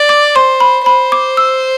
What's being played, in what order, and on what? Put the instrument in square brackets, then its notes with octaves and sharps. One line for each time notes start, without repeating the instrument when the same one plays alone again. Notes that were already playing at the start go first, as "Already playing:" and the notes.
Already playing: [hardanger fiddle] D5
[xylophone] D6
[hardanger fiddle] C5 [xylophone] C6
[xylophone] B5
[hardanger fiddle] C5 [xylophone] B5
[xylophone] D6
E6